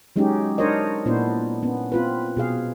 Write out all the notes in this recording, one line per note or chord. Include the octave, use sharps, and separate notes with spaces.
F#3 G#3 C#4 D#4 G4
D4 D#4 A#4 C5 C#5 D#5
A#2 B3 D4 E4 C5
B3 C#4
C4 F4 B4
B2 G#4 F5